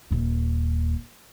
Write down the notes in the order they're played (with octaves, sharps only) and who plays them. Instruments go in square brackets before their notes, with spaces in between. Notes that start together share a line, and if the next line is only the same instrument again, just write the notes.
[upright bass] D#1 D#2